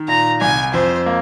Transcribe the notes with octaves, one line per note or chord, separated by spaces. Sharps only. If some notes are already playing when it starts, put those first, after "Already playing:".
Already playing: D#3
A#2 A#5
C2 G#5
F2 C5
A#3